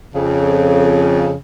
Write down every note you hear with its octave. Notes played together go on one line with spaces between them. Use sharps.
F2 C#3